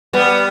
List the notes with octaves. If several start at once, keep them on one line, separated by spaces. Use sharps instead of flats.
G3 B3